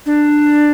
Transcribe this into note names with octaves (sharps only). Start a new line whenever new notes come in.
D4